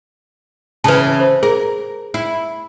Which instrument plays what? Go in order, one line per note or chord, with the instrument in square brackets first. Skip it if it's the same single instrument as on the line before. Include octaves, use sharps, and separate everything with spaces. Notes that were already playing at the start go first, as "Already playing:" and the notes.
[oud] C#3 E3 [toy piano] B4 A5
[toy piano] C5
[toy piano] G#4 [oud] A#4
[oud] E4